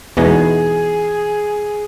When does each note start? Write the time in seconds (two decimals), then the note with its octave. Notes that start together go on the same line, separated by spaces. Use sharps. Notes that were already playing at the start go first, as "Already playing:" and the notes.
0.17 E2 B2 G#3 B3 D#4 G#4